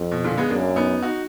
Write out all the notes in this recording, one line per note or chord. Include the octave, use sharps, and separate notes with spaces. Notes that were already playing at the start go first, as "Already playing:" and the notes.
Already playing: F2
B2
A#2 D3
G#3 B3
F#2 A#3 D4
B3 D#4
D#4 F#4